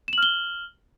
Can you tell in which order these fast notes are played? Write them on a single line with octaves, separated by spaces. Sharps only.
E7 F#7 F6 G7